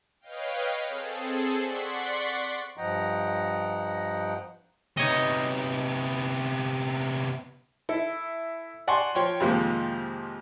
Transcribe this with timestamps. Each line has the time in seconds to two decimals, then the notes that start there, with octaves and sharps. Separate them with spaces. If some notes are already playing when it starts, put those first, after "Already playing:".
0.21 B4 C#5 D#5 F5 G5
0.88 C4 G#4 A4
1.57 D5 F#5 C6 C#6 B6
2.77 G2 F3 D#5 F#5 G5 A#5
4.97 C3 B3 D#4 C#5 D#5
7.89 E4 A4
8.88 D5 F#5 G#5 A5 C6 C#6
9.15 F3 C#5 G5 C6
9.40 F2 C3 D#3 F3 G#3 A#3